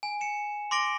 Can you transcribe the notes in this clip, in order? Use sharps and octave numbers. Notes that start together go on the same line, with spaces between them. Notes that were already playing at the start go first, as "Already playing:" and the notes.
G#5
C#7 E7
C6 D6 A#6 D7 G7